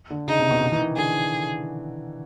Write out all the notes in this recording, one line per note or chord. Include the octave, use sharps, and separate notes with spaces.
D3
C#3 D#4
C3
B2
C#3
E3
D#3
D3 G#4